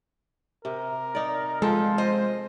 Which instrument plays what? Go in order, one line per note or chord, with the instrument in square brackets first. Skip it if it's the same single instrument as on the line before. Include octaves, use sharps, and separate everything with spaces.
[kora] C3 [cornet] A#4
[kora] D#4 D5
[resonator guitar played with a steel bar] F3 [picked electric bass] G#3 [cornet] F4 [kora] A4 G5
[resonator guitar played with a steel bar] C5 D#5